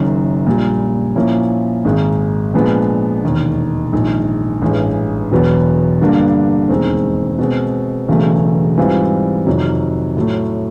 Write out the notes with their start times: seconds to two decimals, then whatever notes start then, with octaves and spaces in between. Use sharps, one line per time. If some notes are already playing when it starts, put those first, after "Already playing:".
Already playing: F#1 F#2 D#3
0.47 A#1 A#2 G3
1.15 A#2 F3 A#3 C#4 E4
1.85 G#1 G#2 D#3 G#3
2.54 A#2 F3 G#3 B3 D4
3.24 E1 D#2 D#3
3.93 A#1 G#2 D#3
4.62 A1 G2 E3 G#3
5.32 E1 E2 B2 F#3 B3
6.01 G2 D3 G3 A#3 D4
6.69 E1 D#2 D#3 G#3 C4
7.39 B2 G#3 C4
8.09 E1 E2 C#3 F#3 A3
8.77 G#2 E3 G3 C4 F4
9.46 F2 C3 D#3 F#3
10.17 A2 F#3 A3